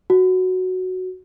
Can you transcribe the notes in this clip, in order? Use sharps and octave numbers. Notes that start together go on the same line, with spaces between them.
F#4